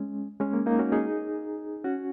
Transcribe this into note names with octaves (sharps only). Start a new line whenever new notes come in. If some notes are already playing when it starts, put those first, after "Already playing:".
Already playing: G#3 C#4
G#3 C#4
A#3
A#3 D#4
C#4 F#4
D#4 G#4
C#4 F#4